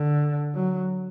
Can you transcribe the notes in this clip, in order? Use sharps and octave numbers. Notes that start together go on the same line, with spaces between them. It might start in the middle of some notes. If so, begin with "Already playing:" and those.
Already playing: D3
F#3